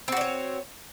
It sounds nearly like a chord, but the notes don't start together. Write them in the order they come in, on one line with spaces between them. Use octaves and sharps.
C4 F#4 D5 C#5